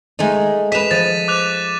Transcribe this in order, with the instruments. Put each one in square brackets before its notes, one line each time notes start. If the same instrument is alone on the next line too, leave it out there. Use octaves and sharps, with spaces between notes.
[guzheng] G#3 A3 D#4
[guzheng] B4 D#5 [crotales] B6 E7 F7
[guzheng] F3 [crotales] A6 D#7
[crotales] D6 F#6 F7